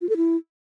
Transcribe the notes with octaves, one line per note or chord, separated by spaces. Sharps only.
F4
A4
E4